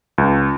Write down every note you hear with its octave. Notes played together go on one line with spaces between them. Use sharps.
C#2